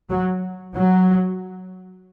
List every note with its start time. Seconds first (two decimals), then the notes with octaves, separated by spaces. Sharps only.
0.10 F#3
0.75 F#3